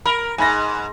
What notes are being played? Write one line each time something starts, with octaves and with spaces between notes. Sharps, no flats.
A#4 B5
G#2 G#5 B5 A#6